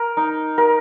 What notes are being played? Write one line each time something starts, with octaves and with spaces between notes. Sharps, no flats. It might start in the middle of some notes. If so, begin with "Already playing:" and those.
Already playing: A#4
D#4
A#4